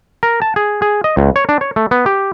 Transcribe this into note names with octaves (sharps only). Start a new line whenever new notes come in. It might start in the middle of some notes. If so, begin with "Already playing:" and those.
A#4
A5
G#4
G#4
D#5
C#2
C#5
D4
C#5
A3
B3
G4